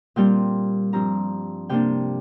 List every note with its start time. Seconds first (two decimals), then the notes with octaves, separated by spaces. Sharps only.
0.16 A#2 G3 C4 G5
0.93 G2 F3 C4 A#5
1.69 C3 A#3 D4 G5